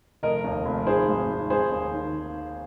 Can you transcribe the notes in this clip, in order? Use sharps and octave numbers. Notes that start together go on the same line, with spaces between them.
F1 A#4 D#5
D#2
F1
D#3 G#4 C5
G#1
D#3
G#3 G#4 C5
D#2
D#3